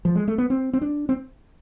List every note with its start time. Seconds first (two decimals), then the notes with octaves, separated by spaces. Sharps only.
0.05 F3
0.15 G#3
0.28 A3
0.38 B3
0.50 C4
0.73 C4
0.82 D4
1.09 C4